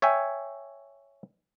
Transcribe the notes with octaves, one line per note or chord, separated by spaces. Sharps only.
C#5 E5 G5 G#5